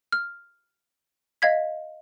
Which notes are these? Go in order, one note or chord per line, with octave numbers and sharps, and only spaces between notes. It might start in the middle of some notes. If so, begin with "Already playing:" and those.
F6
D#5 F5 G#6 B6